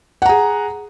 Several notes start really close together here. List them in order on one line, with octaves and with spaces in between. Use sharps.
F#5 A#5 G#4